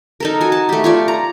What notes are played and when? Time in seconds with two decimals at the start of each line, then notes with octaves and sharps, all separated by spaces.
0.20 D#4 A4 A#4
0.41 F#4 G#5
0.52 A5
0.69 A3 G4
0.84 F4 C#5 D5
1.08 A#5